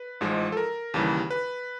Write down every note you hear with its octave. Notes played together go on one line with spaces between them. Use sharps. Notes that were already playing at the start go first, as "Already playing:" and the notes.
Already playing: B4
A1 G#2 F3 G#3
A4
A#4
D#2 C#3 E3 G3
B4